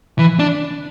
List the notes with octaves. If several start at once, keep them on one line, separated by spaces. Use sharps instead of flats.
E3
D4